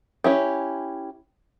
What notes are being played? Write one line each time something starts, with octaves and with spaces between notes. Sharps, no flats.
C#4 E4 G4